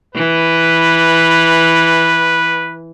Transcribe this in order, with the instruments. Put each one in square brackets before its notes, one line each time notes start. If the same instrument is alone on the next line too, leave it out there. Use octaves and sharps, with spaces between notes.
[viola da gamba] E3 [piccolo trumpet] B4